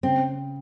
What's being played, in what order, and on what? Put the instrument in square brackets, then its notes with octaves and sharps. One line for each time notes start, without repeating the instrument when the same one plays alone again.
[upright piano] C#3 [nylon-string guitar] C4